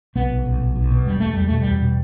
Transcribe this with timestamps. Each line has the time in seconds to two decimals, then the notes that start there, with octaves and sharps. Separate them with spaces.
0.15 B1 B3
0.30 B1
0.46 B1
0.61 B1
0.76 B1
0.91 B2
1.06 E1 G3
1.20 E1 A3
1.34 E2 G3
1.48 B2 A3
1.61 G3
1.67 E2
1.82 B2